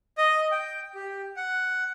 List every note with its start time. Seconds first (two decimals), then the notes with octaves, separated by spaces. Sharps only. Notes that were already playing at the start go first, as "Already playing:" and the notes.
0.18 D#5
0.52 G5
0.95 G4
1.37 F#5